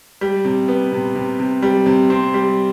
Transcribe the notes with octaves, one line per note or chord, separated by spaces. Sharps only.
G3
C3
B3
C3
C3
C3
G3
C3
C4
G3